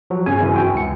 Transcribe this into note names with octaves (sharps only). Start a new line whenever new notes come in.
F3 F#3 F#4
G2 C#3 G#5
F#2 E3 F#3
F#4 G5
C#2 C#7